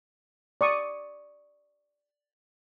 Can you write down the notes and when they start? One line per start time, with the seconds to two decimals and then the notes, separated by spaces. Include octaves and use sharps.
0.61 D5 C#6 D#6